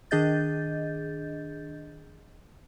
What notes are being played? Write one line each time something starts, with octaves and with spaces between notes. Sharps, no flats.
D#3 D4 G#4 D#5 G6 A6